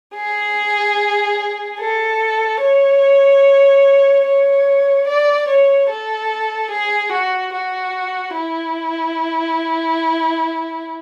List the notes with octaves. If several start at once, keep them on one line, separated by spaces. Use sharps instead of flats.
G#4
A4
C#5
C#5
D5
C#5
A4
G#4
F#4
F#4
E4